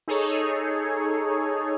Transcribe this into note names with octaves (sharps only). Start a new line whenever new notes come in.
D#4 G#4 A4 C#5